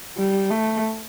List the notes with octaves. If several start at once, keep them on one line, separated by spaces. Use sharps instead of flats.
G3
A3